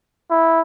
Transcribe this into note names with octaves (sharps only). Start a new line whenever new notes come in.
E4